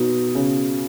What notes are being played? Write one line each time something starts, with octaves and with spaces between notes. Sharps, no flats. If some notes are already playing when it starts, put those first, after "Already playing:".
Already playing: B2 D#4
C#3